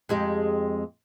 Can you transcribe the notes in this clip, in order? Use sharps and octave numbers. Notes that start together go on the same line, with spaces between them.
F2 G#3 G4